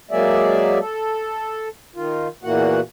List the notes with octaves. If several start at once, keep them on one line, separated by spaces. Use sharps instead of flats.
F#3 G#3 A#3 G#4 D5 E5
A4
D#3 F4
E2 A#2 E3 A#3 F#4 F#5